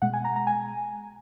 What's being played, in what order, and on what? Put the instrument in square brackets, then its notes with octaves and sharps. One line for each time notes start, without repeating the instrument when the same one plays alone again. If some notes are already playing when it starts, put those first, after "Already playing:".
[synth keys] B2 G#3 F#5
G#5
A#5
A#5
G#5